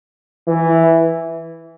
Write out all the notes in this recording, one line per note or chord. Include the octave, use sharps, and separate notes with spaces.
E3